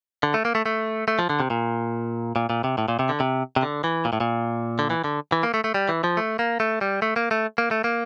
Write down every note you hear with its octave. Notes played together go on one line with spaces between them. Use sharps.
D3
A3
A#3
A3
A3
A3
F3
D3
C3
A#2
A#2
A#2
C3
A2
A#2
C3
D3
C3
C3
D3
E3
A#2
A2
A#2
D3
E3
D3
E3
A#3
A3
A3
G3
E3
F3
A3
A#3
A3
G3
A3
A#3
A3
A#3
A3
A#3